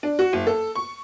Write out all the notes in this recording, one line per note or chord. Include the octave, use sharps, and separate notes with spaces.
D4
F#4
F#1
A4
C#6